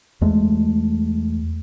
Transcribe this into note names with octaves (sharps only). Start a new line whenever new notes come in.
E2 G#3 A3